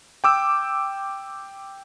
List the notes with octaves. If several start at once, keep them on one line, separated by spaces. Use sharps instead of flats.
G5 D6 E6